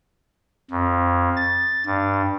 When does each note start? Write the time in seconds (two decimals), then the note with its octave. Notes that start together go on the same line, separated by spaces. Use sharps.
0.71 F2
1.36 A6
1.86 G2